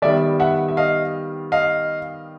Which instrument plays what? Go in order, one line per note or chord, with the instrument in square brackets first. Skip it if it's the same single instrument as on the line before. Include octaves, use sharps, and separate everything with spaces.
[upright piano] D#3 G3 B3 D5 E5
E5 F#5
E5
D#5 F5
D#5 F5